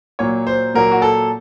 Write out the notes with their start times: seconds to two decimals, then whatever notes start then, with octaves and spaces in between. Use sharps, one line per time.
0.19 A#2 F#3 A#3 C#5
0.47 C5
0.74 A#2 F#3 A#3 A#4
0.91 F#4
1.02 A4